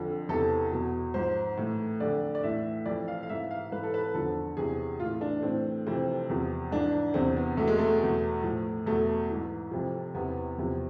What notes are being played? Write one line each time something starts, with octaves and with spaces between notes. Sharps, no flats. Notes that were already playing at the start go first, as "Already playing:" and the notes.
Already playing: F2 D3 F3
E2 C3 E3 A4
E2 B2
G#2 F3 C5
A2 E3
F2 D3 F3 D5
D5
A2 E3 E5
F2 E3 D5
F5
F5
G#2 E3 E5
F5
G#2 E3 B4
A4
B4
E2 D3 F3 A4
E2 C3 E3 G#4
A2 E3 F4
D4
A2 E3 C4
F2 C3 E3 C4
E2 C3 F3
G#2 E3 D4
E2 C3 E3 C4
B3
E2 B2 A3
G#3
A3
E2 B2
A2 F3
E2 B2 A3
G#2 E3
F2 C3 F3
E2 C3 E3 B3
E2 C3 F3